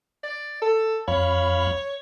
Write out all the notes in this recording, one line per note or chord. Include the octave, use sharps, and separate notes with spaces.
D5
A4
F2 C#5 F5 B5